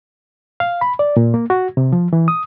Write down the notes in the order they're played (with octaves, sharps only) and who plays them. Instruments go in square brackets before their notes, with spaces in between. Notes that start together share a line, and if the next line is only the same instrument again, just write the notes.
[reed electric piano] F5
B5
D5
A#2
A#3
F#4
C3
F3
E3
D#6